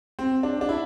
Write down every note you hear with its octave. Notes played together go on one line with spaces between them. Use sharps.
C4
D4
D4
E4